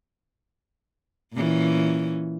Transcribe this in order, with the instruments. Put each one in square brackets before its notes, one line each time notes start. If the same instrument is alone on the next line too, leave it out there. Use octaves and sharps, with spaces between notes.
[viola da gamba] A#2 E3 C#4